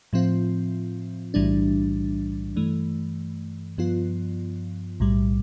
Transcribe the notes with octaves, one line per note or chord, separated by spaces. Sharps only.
A2 F3 C4 F4
B1 A2 E3 G3 D4
G2 E3 A3
G2 F3 B3 F4
B1 A2 G3